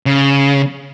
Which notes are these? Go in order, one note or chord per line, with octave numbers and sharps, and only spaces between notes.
C#3